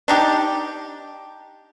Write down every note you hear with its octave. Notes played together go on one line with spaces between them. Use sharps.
D4 D#4 G4